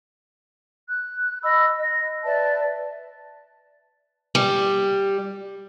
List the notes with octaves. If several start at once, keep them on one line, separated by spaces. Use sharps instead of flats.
F#6
D#5 B5 E6
D#5
B4 D5 E5 A5
G3